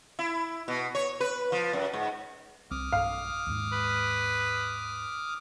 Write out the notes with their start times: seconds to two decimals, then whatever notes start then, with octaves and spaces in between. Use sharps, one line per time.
0.19 E4
0.68 B2
0.95 C#5
1.20 B4
1.52 F3
1.73 F#2
1.93 G#2
2.71 C2 C4 D6 D#6 F6
2.92 B1 G2 F5
3.47 D#2 G#2
3.72 B4